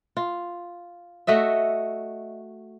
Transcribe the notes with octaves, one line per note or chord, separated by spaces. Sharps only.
F4
A3 F#4 D#5 E5